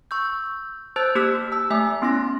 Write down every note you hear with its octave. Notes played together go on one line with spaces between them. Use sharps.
C#6 E6 G6
C5 A5 E6 F#6 G6 A6
A#3 G4 D6 F6 F#6 B6
A5 E6
A3 E5 G#5 D6
B3 C#4 E4 C6 F#6 A#6